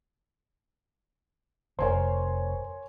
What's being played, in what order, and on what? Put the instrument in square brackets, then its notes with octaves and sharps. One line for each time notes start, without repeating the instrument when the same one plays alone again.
[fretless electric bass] F1 [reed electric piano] A#4 C5 [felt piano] C#5 G#5 C6